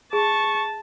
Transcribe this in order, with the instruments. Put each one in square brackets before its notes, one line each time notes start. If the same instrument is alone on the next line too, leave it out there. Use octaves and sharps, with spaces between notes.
[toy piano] G#4 [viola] A5 [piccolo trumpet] C#6